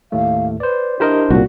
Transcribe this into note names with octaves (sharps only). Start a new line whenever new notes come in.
D#2 A2 A3 F5
B4 C5 D5
D4 E4 G4 A#4 C5 D#5
C2 A#2 F#4